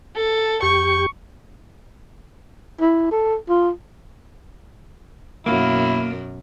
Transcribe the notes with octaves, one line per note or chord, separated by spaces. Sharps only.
A4
F2 G4 C#6 G6
E4
A4
F4
F#2 B2 A#3 E4